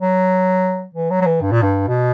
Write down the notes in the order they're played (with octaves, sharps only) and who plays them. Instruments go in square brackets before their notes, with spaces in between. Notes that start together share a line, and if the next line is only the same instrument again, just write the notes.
[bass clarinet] F#3
E3
F#3
F#3
E3
G2
A#2
G2
B2